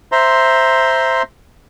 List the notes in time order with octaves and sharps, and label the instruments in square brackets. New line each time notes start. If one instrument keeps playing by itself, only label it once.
[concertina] C5 E5 A#5 C6